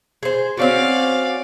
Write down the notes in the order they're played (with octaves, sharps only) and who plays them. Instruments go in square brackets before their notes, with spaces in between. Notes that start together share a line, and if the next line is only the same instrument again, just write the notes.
[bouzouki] G#4 C5
[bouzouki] C4 C#4 F#4 [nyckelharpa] D5 F5